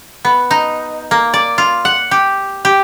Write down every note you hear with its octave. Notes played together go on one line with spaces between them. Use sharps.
B3
D#4
A#3
D5
F4
F#5
G4
G4